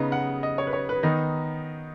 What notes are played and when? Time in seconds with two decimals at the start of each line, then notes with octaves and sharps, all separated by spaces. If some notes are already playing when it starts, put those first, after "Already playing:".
Already playing: C#3 B3 D#4 D#5
0.12 F#5
0.43 D#5
0.58 C#5
0.67 B4
0.73 C#5
0.89 B4
1.03 D#3 B3 D#4 D#5